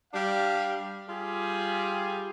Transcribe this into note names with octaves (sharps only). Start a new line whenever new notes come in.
G3 D4 F5
G3 F4 G4 G#4